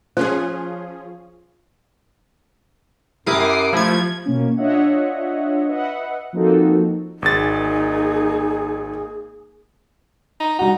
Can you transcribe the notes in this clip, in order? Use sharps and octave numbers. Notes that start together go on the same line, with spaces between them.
F3 C#4 F4 G#4 C5
F#2 E4 G4 A#4 D6 D#6 C7
F3 A3 E4 G#6
B2 A#3 C#4
D4 F4 C#5 D#5 E5 F#5
B4 D#5 E5 F#5
F3 A#3 C4 D#4 F#4 A4
G#1 A#3 D#4 G#4 A6
D#4
G3 D#4 F#4